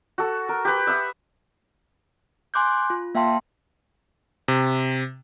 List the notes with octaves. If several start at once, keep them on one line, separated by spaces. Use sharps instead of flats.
F#4 A4
A#4
G4 B4
E5 F#5 D#6
G#5 C6 D6 F#6 G6
F4
A#3 E5 F5 G5 A5 C6
C3